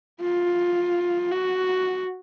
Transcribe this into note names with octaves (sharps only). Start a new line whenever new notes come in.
F4
F#4